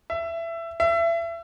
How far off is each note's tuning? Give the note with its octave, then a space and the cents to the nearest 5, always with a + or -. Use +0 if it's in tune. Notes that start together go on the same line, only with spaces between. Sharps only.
E5 +20
E5 +30